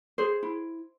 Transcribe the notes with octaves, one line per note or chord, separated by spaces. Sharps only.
G#4 C5
E4